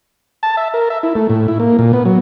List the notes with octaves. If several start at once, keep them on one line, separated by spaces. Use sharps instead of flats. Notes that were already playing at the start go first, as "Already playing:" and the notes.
A5
E5
A#4
E5
E4
A3
A2
E4
A#3
A#2
B3
F#3